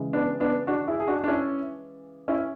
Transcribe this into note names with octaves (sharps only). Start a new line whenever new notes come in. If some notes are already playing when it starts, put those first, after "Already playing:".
Already playing: C#3 E3 G#3
B3 D4
B3 D4
D4 F#4
E4 G#4
G#4
D4 F#4
D4
C#4 E4
C#4 E4